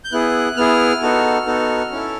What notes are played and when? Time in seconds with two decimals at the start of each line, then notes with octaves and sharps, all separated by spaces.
0.05 G6
0.12 B3 E4 G#4 F#6
0.57 B3 E4 G#4 F6
1.02 B3 D#4 F#4 A4
1.46 B3 D#4 F#4 A4
1.91 C#4 E4 A4